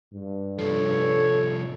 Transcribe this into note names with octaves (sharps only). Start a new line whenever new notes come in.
G2
C2 F3 A4 C#5